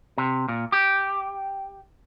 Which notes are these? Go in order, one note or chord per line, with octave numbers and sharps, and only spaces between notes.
C3
A#2
G4